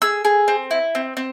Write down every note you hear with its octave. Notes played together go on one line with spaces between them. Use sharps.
G#4 E6
G#4
C4
E4
C4
C4